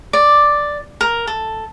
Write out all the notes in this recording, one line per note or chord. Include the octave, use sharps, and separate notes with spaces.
D5
A#4
A4